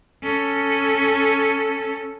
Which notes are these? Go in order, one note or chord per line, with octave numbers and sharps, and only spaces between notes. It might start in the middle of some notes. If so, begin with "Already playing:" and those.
C#4 A4